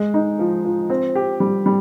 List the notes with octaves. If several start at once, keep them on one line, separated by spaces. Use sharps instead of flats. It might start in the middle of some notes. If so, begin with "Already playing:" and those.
Already playing: G#3
D#4
F3
F3
C4
G4
G3
G3